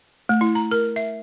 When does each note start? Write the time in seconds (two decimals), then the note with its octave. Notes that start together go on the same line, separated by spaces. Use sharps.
0.29 A3
0.41 E4
0.55 A#5
0.71 A#4
0.96 E5